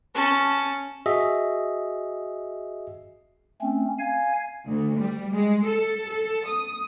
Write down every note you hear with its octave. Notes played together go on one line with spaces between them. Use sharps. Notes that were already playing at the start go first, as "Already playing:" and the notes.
C#4 A5
F#4 G#4 D#5 E5
A3 C4 C#4
F5 G#5 G#6
D2
G3
G#3
A4
A4
D#6